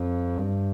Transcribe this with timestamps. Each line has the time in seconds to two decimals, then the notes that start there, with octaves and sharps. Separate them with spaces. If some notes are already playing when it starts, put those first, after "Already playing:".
Already playing: F2
0.38 G2